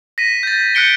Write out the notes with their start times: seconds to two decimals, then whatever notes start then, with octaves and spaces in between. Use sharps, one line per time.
0.18 A#6 B6 D#7
0.43 G6 A6
0.75 F#6 G6 B6 C#7 D7 G7